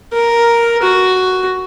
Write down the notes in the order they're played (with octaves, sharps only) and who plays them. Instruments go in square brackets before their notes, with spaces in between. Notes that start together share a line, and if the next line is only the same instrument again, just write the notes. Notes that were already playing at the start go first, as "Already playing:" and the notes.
[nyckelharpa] A#4
F#4